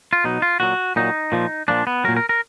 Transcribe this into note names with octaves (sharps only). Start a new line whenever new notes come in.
F4
B2 F#3 D#4
F4
A#2 F#3 F#4
A#2 F#3 D#4
A#2 F3
A#2 F3 D4
B3
A#2 F#3 A#4
A#4
A#4